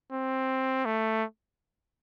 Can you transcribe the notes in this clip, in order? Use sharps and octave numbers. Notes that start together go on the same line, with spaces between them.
C4
A3